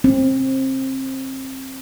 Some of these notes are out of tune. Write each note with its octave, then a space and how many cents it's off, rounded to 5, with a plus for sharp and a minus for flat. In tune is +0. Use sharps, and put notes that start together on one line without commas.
C4 +25